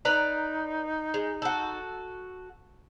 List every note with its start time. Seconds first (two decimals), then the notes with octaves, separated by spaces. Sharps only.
0.05 D#4 B4 D5 A#5
1.14 G#3
1.42 F#4 A4